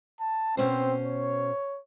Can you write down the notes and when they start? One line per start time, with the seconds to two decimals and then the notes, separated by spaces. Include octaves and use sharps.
0.20 A5
0.57 B2 C4 C#4 C5
1.03 C#5